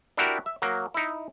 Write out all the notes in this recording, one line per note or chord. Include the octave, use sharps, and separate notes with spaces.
D4 E4 F#4 G4 A#4
E5
F#3 A#3
D#4 E4